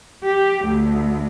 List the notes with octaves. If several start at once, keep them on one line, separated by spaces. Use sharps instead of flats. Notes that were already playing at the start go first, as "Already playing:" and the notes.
G4
D2